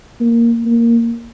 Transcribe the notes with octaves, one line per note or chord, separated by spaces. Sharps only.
A#3
A#3